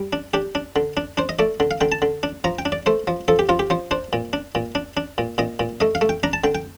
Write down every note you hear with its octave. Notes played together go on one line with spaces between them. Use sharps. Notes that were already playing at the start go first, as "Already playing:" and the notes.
Already playing: G3
D4
D4 G4
D4
D3
D4
D4 C5
D#5
A3 D5
D3
F5
D3 G5
A5
D3
D4
F3 A#5
G5
D4
D5
A3 C5
F3
F3 A4
G4
F3 F4
G4
F3 C5
D4 C5
A#2
D4
A#2
D4
D4
A#2
A#2 D#5
A#2
A3 D#5
F5
A3
G5
D4 A#5
A5
D3 G5
G5